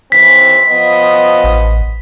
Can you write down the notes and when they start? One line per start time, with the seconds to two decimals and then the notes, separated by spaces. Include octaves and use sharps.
0.12 D#2 E3 C4 B6
0.70 F3 B3 D#5
1.44 A1